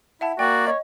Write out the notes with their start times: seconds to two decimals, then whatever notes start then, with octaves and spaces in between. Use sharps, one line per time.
0.21 E4 E5 F#5 A5
0.39 A#3 F#4 D5 G5
0.67 C#5 D#5